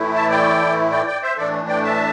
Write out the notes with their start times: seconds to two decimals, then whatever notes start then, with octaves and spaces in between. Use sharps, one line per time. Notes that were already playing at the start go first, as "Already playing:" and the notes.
Already playing: A2 E3 A3 E4
0.15 E5 A5
0.30 D5 G5
0.91 D5 G5
1.07 D5 G5
1.22 C5 E5
1.38 A2 E3 A3 D4 A4 D5
1.68 D5 G5
1.84 E5 A5